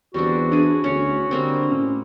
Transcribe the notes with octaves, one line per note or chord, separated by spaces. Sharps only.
E2 G3 C4 D4 F#4
D4 E4 G#4
D2 C#4 C#5
D3 G3 A#3 C4
A2 C#4